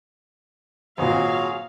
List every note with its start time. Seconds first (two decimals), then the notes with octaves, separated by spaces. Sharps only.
0.98 G#1 A#2 F#3 F#4 G#4 F5